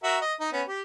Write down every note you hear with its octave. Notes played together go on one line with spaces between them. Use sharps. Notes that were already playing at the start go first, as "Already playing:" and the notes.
F#4 A#4 E5
D#5
D#4
B3 C#4
G4